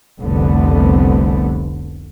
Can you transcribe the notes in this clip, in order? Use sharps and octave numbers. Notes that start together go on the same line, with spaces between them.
F1 C2 D3 A3 B3